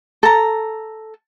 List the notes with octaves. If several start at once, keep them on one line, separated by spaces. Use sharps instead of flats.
A4 A#5